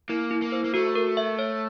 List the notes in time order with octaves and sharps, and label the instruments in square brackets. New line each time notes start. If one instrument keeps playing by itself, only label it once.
[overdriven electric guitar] A#3 [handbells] E4
[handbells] E4
[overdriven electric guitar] A#3
[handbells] C5
[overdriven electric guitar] A#3
[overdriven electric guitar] A3 [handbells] F#4
[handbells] A#4
E5
C#5